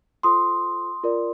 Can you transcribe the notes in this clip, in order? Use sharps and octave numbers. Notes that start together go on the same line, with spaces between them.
F4 A4 C5 C6 D#6
F4 A#4 D5